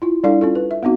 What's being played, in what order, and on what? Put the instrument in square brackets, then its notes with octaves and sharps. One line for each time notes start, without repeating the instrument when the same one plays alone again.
[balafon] E4 F4
G3 D4 E4 A4 D5 F5
C#4 F4 A4
B4
E5
B3 C4 D#4 F#4